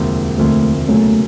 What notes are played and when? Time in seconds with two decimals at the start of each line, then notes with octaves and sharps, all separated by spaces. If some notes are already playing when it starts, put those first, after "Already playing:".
Already playing: E1 D2 C3 F3 A#3
0.37 E1 D2 C3 F3 A3 A#3
0.88 C#2 B2 F#3 A3 A#3 C#4